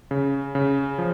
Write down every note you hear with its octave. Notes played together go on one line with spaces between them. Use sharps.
C#3
C#3
F3